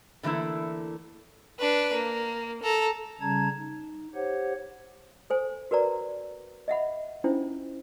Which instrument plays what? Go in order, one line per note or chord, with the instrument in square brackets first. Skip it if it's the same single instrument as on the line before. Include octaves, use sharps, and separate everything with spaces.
[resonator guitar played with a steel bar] D3 E3 A3 A#3 E4
[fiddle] D4 B4
A#3
A4 A#5
[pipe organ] C#3 G3 C#4 A5 A#5 G#6
D#4
G4 C5 C#5 F#5
[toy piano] A4 C5 G#5
F#4 A#4 B4 D5 A#5
D#5 E5 F#5 B5
C#4 D4 E4 F4 C5